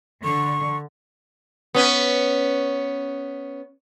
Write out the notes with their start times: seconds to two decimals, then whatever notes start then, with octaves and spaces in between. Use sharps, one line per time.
0.24 D3 C#6
1.75 B3 C#4